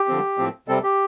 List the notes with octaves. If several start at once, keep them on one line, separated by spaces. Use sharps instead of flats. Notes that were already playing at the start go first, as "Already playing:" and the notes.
Already playing: G4
D3 F3 C4
A2 F3 C4
C3 G3 C4 A4
G4